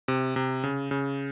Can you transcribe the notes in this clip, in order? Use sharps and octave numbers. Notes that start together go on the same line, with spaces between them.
C3
C3
C#3
C#3